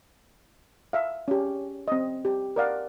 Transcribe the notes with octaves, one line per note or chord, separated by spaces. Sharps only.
E5 F5
C#4 G4
C4 D#5
G4
A#4 D5 F5 F#5